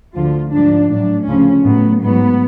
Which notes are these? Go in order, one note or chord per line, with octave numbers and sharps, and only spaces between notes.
D2 D3 F3 F4
G#2 F3 D4
A2 F#3 D4
D2 C#3 F3 C#4
A2 F#3 B3
G#2 F#3 B3